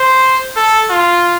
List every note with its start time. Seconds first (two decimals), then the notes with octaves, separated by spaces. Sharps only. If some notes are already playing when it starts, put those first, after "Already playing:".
Already playing: C5
0.56 A4
0.90 F4